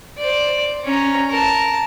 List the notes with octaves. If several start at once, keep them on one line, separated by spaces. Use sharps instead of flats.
C5 D5
C#4 A#5
A#4 A5